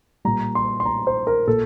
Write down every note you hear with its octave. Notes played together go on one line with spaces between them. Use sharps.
A#2 G3 A#5
C6
C6
A#5
C5
A#4
A#2 A4